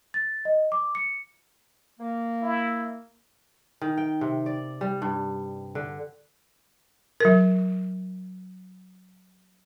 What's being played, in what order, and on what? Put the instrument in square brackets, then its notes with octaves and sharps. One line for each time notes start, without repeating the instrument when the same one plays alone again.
[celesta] A6
D#5
D6
C#7
[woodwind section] A#3
[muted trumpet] E4
[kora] D#3
G5
C3
D5
G3
G2
D3
[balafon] F#3 A#4